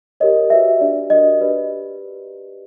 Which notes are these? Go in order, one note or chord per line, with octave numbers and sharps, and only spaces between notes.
G4 A#4 C#5 D#5
F#4 B4 D5 E5
D4 G4 B4 D5
D4 F#4 A#4 D5 D#5
G4 B4 D5